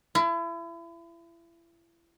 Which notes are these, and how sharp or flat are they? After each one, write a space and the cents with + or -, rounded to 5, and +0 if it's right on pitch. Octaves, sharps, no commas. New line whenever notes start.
E4 +35